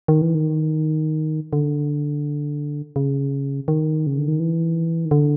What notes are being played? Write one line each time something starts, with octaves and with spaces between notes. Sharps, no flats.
D#3
E3
D#3
D3
C#3
D#3
C#3
D3
D#3
E3
D#3
D3